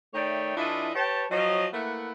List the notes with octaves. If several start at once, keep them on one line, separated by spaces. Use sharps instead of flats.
D#3 A3 C#5 D5 E5 G5
E3 D4 E4 F4 A4 D#5
G4 B4 C#5 G5 A5
F3 F#3 C#5 D#5
A3 A#3 E4 B4 F#5